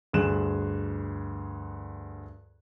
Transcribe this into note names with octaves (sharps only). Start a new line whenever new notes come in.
D2 G2 G#4 F#6 E7